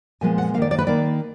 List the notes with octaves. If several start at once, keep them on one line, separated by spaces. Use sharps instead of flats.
A#2 F3 G#3 B3 G#5
F#5
D#3 A#3 D5 F5
D5
B4
D#3 A#3 D5